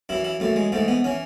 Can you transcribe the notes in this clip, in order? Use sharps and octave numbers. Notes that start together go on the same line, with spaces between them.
F#2 E3 E4
E4
F#2 E3 A3
G#3
G#2 E3 A3
B3
E3 C#4